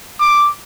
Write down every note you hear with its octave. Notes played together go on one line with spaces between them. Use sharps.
D6